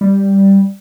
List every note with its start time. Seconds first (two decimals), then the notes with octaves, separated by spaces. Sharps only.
0.01 G3